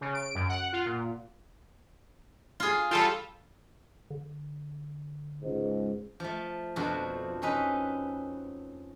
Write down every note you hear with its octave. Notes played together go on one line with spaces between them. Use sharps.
C#3
D7
F#2
F#5
F4
A#2
F4 G#4
G3 F4 A4 G5
D3
C#2 G#2
F3 A3
F2 B2 D3 F3 D4 F#4
C4 C#4 D#4 B4